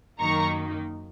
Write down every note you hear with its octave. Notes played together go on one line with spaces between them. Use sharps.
F#2 D#3 A#3 D#4 A#5 C#6